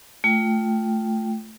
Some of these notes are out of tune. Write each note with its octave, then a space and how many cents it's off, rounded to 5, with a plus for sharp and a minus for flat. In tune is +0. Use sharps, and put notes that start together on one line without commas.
A3 +0 F4 +5 G5 +0